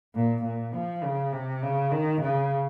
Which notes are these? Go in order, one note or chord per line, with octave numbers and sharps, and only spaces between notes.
A#2
A#2
F3
C#3
C3
C#3
D#3
C#3